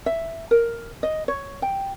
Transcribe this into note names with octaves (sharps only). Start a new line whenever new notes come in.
E5
A#4
D#5
C#5
G5